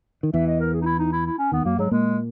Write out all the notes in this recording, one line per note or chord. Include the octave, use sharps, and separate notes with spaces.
D#3
E2 E3 E5
D#5
A#4
G#4
D#4
E4
D#4
E4
E4
C#4
D#2 D#3 B3
F#2 F#3 A#3
G#2 F#3 G#3
A#2 G#3 A#3